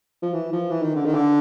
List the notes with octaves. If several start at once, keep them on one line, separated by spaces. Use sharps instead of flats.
F3
E3
F3
E3
D#3
D3
D#3
D3